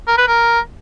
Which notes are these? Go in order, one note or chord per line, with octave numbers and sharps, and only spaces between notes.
A#4
B4
A#4